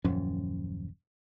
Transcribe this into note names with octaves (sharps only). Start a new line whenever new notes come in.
D#1 F#2 F3 C#4